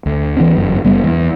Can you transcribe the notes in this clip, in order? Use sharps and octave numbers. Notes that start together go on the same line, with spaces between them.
D2
E3 B3 C#4
G1 F#2
F#1 G3 B3
E2